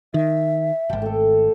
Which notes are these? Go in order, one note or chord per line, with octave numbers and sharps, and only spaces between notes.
D#3 E5
D#1 G#1 G5 A5 D6
A3 A4